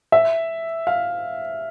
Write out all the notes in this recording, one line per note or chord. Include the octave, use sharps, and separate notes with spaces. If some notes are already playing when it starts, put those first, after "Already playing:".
E5
F5